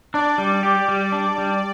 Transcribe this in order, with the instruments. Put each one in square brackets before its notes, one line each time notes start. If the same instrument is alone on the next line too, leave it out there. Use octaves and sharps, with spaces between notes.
[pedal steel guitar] D4 [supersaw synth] D5
[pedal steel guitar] G3
G4
G3
D4
G3